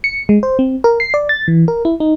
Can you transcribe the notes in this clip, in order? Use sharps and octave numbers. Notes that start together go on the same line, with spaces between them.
C#7
G#3
C5
C4
A#4
C7
D5
A6
E3
A#4
E4
D#4